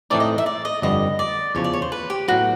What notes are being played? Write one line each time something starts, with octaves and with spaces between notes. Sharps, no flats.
A2 E3 A3 C4 D#4 D5
D#5
E5
D5
D#5
G1 F2 D3 G3 B3 D#5
D5
E2 C#3 F3 C#5
D5
C#5
C5
B4
G4
A2 F#3 B3 F#4